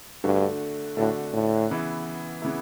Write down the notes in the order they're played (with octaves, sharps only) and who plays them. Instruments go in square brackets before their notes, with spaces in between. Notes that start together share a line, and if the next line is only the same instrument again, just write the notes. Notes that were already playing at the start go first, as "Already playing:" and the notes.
[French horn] G2 [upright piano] D3 A3 D4 F#4
[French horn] A2 [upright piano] D3 A3 D4 F#4
[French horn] A2
[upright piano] C#3 E3 B3 E4
C#3 E3 B3 E4